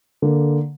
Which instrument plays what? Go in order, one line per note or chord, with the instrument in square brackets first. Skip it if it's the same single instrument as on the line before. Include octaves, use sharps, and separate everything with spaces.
[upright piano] D3 A#3